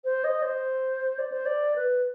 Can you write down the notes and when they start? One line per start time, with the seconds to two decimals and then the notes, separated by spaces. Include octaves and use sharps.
0.04 C5
0.24 D#5
0.43 C5
1.19 D5
1.32 C5
1.45 D5
1.76 B4